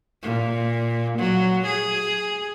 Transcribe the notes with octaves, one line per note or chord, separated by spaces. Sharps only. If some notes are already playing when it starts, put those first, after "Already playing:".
A#2
F#3
G#4